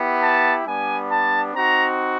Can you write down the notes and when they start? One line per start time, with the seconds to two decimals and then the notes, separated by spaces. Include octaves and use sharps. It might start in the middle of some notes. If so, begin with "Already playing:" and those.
Already playing: B3 E4 G4
0.21 A5
0.66 G3 B3 D4 G#5
1.09 A5
1.53 C4 D#4 F#4 A#5